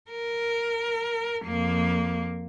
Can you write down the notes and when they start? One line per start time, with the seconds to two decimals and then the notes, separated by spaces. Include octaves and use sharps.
0.11 A#4
1.45 F2 A#3